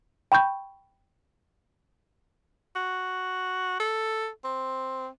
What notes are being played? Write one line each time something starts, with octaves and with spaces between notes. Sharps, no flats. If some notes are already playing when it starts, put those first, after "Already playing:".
G5 B5 C#6 G6
F#4
A4
C4